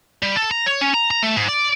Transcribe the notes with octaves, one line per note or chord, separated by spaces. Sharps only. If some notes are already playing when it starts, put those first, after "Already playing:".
G3
A4
A#5
C#5
C#4
A#5
A#5
A3
G#2
D5